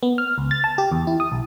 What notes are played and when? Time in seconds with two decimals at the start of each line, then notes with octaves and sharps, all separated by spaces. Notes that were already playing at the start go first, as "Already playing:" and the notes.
0.03 B3
0.18 F6
0.38 C#2
0.51 A6
0.64 A5
0.78 G4
0.92 E2
1.07 E4
1.20 D#6
1.32 B1